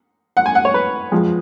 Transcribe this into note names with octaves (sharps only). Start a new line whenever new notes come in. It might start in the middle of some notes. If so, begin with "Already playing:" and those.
F#5
G#5
F#5
C#5
B4
F2 F3 G#3